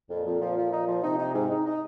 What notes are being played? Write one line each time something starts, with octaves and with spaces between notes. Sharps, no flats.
F2 A#2
F2
F3
F3
D#4
F3
C3 D#4
D#4
G#2
D#4
D#4